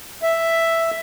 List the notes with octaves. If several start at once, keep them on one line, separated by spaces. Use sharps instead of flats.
E5